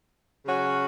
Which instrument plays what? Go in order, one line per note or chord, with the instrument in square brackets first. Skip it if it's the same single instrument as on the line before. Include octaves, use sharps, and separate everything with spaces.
[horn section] C#3 F#3 C#4 F#4